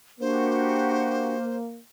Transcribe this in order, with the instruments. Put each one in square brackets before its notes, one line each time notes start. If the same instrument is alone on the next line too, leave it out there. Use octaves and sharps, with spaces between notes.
[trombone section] A#3 [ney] D4 [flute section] F#4 G4 [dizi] C5